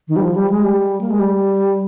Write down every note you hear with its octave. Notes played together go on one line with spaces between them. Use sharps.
D#3
G3
F3
G3
G#3
G3
A#3
G#3
G3